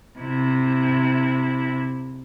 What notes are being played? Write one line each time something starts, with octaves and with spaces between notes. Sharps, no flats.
C3 E4